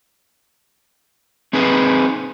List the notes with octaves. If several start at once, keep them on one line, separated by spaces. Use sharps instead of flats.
C4 D#4 G#4 B4